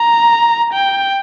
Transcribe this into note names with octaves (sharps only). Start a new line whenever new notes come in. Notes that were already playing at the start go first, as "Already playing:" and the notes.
Already playing: A#5
G5